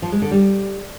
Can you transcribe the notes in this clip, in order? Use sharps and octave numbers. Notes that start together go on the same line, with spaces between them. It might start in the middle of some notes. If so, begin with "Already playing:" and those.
F3
G#3
D3
G3